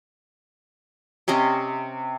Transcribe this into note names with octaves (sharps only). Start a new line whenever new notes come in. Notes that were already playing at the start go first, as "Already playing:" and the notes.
C3 C#4 D#5 A#5